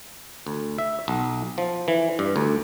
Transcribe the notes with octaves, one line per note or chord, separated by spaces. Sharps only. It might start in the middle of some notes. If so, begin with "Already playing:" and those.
D2
E5
B1
F3
E3
G2
D2